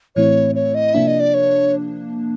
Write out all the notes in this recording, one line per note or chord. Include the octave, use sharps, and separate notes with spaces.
A2 E3 A3 C4 E4 C#5
C#5
D#5
C3 F3 A#3 D4 E5
D#5
D5
C#5